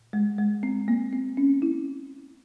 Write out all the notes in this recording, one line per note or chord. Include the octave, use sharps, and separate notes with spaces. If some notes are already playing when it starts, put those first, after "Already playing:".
Already playing: A#2
G#3
G#3
C4
A#3
C4
C#4
E4